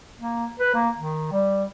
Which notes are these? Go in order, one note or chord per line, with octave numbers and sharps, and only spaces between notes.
A#3
B4
A#3
D#3
G3